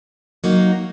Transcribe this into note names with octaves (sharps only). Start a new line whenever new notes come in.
F#3 A#3 D#4